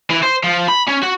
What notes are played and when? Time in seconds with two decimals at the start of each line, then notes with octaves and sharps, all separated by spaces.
0.10 E3
0.23 C5
0.44 F3
0.68 B5
0.87 C#4
1.03 F#4